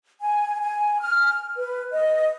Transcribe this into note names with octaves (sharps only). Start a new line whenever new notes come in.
G#5
G#5
F6
B4
D#5